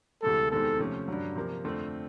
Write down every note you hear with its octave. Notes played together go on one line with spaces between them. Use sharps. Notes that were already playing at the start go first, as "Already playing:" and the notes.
D2 C3 E3 G#3 A4
E2 C3 D#3 G#3 C4 A4
C3 F3 A3 C#4
G2 D3 F#3
C3 F3 A#3
F2 D3 F3 A3 C4